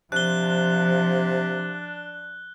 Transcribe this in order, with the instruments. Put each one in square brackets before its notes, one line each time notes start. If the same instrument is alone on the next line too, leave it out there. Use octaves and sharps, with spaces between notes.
[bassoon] C3 [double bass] F3 [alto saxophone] D4 [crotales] F#6 G7